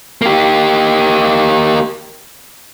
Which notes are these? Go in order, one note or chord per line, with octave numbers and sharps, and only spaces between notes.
A#3 G4